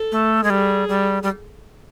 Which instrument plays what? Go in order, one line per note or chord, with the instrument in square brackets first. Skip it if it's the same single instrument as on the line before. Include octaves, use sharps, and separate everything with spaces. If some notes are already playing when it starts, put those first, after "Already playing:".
Already playing: [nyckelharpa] A4
[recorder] A3
G#3
[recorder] G3 [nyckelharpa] G#4
[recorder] G3
G3